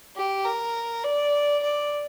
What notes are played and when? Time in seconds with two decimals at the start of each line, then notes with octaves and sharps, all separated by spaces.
0.16 G4
0.45 A#4
1.04 D5
1.63 D5